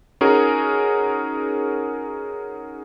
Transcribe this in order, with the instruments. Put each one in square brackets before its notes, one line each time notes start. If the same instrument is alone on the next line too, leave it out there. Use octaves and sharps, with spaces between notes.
[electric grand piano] C#4 D#4 F#4 G#4 A#4